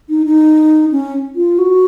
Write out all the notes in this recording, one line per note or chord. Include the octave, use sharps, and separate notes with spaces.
D#4
D#4
C#4
F4
F#4